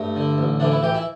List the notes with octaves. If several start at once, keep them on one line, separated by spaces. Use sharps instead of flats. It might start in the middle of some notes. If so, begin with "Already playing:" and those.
Already playing: G2 A3
D3
A1
D3 E3 D4
E3 E4
E3 G4 G5
E4 E5